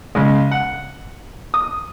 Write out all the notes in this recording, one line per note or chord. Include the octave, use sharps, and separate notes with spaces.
C#3 G#3
F#5
D#6